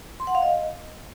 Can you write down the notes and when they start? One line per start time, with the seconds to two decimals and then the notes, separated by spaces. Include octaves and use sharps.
0.20 C6
0.27 F#5
0.35 F5
0.42 D#5